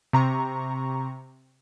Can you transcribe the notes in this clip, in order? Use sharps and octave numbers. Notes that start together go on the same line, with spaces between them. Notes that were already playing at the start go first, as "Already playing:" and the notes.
C3 A#5 C#6